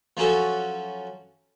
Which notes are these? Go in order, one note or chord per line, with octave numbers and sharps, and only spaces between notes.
F3 F#3 C#4 F#4 A4